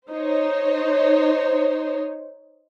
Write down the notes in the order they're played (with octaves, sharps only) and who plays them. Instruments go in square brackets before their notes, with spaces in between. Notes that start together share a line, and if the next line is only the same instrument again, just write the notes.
[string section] D#4 C5 C#5